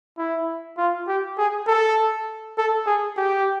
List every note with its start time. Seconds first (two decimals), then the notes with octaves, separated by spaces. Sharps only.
0.18 E4
0.78 F4
1.08 G4
1.38 G#4
1.67 A4
2.58 A4
2.87 G#4
3.17 G4